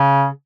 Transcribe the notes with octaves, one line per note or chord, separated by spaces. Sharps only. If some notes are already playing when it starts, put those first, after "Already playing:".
Already playing: C#3